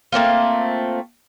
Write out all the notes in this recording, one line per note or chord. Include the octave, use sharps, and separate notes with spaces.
A3 A#3 C4 F4